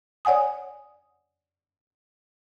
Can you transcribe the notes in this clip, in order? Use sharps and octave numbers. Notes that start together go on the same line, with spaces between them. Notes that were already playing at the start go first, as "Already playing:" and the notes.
C#5 D5 F#5 G#5 D#6